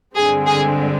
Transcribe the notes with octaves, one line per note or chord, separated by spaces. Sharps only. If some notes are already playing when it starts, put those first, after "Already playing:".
G2 D3 G#3 C4 G#4
G#4